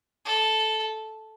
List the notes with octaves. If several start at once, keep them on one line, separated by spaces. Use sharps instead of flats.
A4